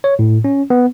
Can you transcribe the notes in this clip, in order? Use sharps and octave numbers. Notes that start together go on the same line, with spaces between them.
C#5
A2
C#4
B3